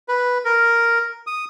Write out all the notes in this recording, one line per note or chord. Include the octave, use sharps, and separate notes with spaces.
B4
A#4
D#6